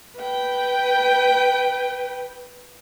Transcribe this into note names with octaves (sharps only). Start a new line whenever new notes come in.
B4 G5